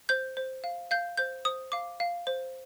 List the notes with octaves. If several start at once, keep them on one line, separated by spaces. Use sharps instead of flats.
C5 G6
C5
F5
F5 G6
C5 G6
C5 D#6
F5 D6
F5
C5